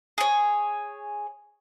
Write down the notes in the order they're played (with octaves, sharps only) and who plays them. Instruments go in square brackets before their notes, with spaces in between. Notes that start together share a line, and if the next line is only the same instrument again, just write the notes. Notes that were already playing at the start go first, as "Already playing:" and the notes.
[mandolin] G#4 C#5